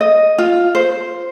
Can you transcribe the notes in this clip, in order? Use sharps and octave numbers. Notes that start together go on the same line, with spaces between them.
D#5
F4
C5